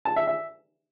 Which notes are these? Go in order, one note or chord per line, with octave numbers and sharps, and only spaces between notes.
A5
E5
E5